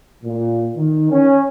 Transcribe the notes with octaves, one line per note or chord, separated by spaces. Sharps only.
A#2
D#3
C#4